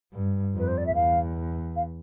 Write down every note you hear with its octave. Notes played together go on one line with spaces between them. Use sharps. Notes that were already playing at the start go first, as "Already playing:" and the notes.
G2
F2 B4
C5
D5
E5
E2 F5
F5